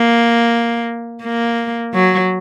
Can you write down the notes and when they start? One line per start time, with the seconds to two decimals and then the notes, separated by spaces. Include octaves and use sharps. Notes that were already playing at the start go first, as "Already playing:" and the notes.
Already playing: A#3
1.23 A#3
1.94 F#3